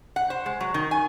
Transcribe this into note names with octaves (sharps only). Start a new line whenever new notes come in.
F#5
C5
G#3
F#3
D#3
G#5